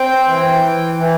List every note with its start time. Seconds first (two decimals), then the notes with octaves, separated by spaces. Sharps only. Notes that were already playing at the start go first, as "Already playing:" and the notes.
Already playing: C4 G5
0.28 E3
0.63 E3
0.98 E3